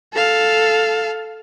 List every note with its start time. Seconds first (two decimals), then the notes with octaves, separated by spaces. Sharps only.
0.13 A4 F5